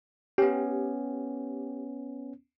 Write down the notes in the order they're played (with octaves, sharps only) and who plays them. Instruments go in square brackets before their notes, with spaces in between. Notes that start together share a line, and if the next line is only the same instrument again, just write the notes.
[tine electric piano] B3 C#4 [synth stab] G4